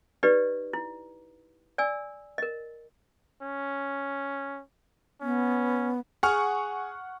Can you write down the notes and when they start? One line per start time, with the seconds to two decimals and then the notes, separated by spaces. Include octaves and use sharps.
0.23 D#4 G4 B4 D5 D#5
0.73 E4
1.78 D5 G#5 E6
2.38 A#4 D#5
3.42 C#4
5.22 B3 C#4
6.23 G#4 F#5 C#6 F6